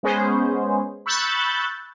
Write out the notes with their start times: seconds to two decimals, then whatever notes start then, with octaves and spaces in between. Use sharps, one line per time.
0.03 G#3 B3 C#4 G#4 C5
1.06 B5 C#6 E6 F#6 G6 A6